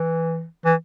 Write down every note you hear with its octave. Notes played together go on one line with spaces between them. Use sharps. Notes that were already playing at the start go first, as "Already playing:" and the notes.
Already playing: E3
E3